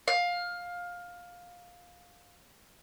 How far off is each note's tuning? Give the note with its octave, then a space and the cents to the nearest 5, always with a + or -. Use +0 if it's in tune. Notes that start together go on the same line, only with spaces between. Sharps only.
F5 +15